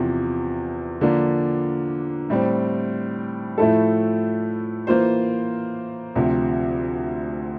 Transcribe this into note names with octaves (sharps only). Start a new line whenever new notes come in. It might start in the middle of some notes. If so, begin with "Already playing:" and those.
Already playing: E2 C3 F3
D3 F3 A#3 D4
A2 G3 C4
A2 F3 A3 E4 A4
E3 A#3 F4 C5
D2 C3 F3